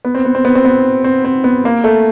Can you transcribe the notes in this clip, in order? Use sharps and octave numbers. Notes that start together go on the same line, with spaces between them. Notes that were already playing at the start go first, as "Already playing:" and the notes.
B3
C4
B3
C4
B3
C4
B3
C4
C4
B3
A#3
A3